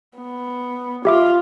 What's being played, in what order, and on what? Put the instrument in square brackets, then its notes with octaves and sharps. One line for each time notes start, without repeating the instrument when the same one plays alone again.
[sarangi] B3
[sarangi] F4 [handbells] G4 E5 D6